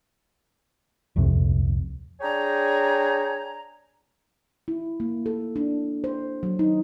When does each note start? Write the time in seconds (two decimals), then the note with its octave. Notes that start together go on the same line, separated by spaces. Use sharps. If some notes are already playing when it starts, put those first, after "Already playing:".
1.16 D#1 C2 F2 C3
2.21 D4 G#4 C#5 G5 G#5 A#5
4.68 E4
5.00 A#3
5.26 A4
5.56 D4
6.04 C5
6.43 F#3
6.59 D#4